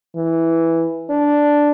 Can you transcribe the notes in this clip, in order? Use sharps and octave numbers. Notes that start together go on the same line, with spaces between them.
E3
D4